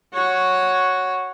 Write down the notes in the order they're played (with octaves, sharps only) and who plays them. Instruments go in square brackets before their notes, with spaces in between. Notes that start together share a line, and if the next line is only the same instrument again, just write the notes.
[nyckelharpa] F#4 C#5